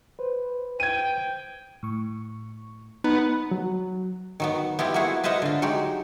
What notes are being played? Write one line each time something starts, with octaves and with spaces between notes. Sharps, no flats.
B4 C5
G5 G#6 D#7
A2 C#6
B3 D#4
F#3
D#3 F#3 B3
B3 E4 F4 G4
A#3 B3 E4 F#4 G#4
F4 B4 C5 D#5 E5 F#5
D3 F4
F#3 G#3 D#4 G4